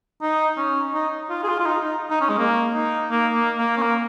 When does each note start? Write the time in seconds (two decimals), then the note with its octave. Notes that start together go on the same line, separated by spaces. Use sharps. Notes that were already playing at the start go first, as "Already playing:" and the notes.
0.22 D#4
0.57 C#4
0.94 D#4
1.30 F4
1.44 G#4
1.48 F4
1.60 F4
1.66 D#4
1.84 D#4
2.10 D#4
2.21 C#4
2.29 G#3
2.38 A#3
2.74 D#4
3.11 A#3
3.34 A#3
3.58 A#3
3.77 C#4
3.82 A#3